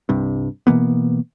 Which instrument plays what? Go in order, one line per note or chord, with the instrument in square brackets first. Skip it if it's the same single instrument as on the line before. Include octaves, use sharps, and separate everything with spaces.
[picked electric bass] C2 G2 C3
B2 E3 A#3 B3